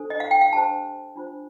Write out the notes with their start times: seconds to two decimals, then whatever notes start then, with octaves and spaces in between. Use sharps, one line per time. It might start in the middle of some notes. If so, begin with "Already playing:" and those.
Already playing: D4 A4 C5
0.10 D#5
0.20 F5
0.31 G5
0.41 F5
0.52 D4 G4 C5 A5
1.16 D4 F4 C5